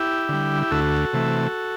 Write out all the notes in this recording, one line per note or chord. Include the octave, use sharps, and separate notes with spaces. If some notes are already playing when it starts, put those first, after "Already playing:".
Already playing: E4 G4
D3 G3
G4
D2 F#4 A4
C3 E3 A3